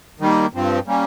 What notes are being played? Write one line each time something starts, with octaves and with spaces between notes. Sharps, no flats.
D#3 G3 A#3
G2 F3 C4
G3 A#3 C#4